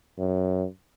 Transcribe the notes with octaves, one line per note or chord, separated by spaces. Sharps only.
F#2